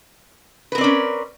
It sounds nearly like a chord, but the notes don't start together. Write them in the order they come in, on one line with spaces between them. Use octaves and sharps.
B4 A#4 C4 D5 C#4